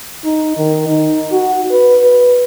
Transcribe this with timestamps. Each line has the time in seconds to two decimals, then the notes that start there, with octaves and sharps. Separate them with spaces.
0.24 D#4
0.57 D#3
0.88 D#4
1.32 F#4
1.71 B4
2.02 B4